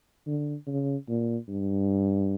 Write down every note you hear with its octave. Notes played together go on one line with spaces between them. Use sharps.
D3
C#3
A#2
G2